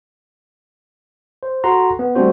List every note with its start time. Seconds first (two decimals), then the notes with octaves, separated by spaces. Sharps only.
1.43 C5
1.64 F#4 A4 F#5 A#5 C6
1.99 B3
2.15 G3 A3 C4 D4 F#4 C5